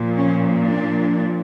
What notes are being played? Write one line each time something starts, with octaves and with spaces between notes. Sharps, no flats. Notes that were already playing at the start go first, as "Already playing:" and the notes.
Already playing: A#2 F3
C#4
D4